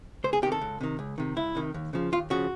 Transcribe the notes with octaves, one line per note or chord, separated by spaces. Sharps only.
C#2 C5
G#4
C3 D#3 G4
A4
C#2
C3 D#3
C#2
C3 D#3
C#2 E4
C3 D#3
D#2
C#3 F3
D#2 F4
C#3 F3 F#4